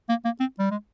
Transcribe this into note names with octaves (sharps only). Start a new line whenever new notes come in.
A#3
A#3
C4
G3
G#3